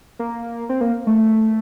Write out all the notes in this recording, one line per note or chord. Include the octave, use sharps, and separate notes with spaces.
A#3
C4
A#3
A3